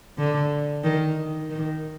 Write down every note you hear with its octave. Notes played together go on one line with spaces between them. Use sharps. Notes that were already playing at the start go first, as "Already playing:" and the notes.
D3
D#3
D#3